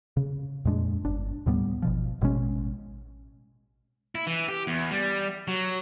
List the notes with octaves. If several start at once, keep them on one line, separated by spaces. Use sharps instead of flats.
C#3
F2 A#2 G#3 D4
G1 D4
D#2 A2 G3 B3
G#1 B2 F3
A1 B2 G#3 C#4
E4
E3
G4
E2
G3
F#3